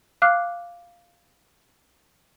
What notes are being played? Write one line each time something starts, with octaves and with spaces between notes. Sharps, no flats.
F5 D6 F6 F#6 C7